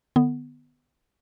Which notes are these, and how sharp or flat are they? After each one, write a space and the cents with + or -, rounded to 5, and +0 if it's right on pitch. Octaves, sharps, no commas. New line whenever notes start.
D3 +40 B3 +0